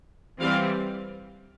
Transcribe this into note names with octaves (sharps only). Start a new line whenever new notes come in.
E3 G3 C4 F5